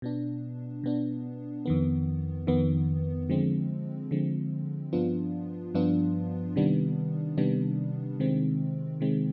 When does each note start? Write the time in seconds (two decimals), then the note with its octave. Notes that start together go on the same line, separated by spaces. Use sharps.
0.02 B2 B3 D4
0.84 B2 B3 D4
1.66 F2 D#3 B3
2.47 F2 D#3 B3
3.30 D3 F3 G#3 C4
4.11 D3 F3 G#3 C4
4.93 G2 F3 B3 D4 F4
5.74 G2 F3 B3 D4 F4
6.56 C3 D#3 G3 B3 D4
7.37 C3 D#3 G3 B3 D4
8.20 C3 D#3 G#3 C4
9.01 C3 D#3 G#3 C4